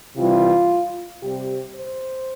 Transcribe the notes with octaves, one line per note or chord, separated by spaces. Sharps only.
C3 E3 G3 F4
C3 G3 C4 G4
C5